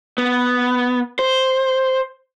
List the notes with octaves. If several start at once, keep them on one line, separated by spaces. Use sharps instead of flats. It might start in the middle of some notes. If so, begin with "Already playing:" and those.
B3
C5